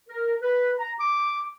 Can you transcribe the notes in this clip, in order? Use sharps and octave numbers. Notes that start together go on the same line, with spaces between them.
A#4
B4
A#5
D6